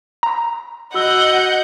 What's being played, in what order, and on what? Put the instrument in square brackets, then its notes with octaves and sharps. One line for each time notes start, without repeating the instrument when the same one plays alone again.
[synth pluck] A#5
[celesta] F#4 E6 G7 [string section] D#5 G6 [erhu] F#5